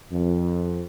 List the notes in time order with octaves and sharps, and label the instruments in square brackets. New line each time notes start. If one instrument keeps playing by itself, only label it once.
[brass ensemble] F2